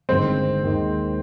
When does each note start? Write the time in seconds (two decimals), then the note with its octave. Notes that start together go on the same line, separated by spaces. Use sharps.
0.09 G1 G2 D#3 G#3 C4
0.63 D#2 D#3 G#3